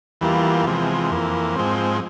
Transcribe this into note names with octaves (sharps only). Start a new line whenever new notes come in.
E2 E3 G3 A#3 F4
E2 C3 F3 G#3
F2 E3 A#3
G#2 F3 G#3 C4